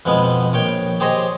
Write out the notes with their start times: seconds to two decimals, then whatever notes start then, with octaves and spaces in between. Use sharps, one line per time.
0.05 F2 B2 G#3 B3
0.53 A#1 C#5 G5
1.00 G4 G#4 C5 C#5 D#5